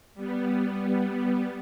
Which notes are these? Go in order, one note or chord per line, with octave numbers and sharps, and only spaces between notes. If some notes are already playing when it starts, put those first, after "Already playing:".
G3 B3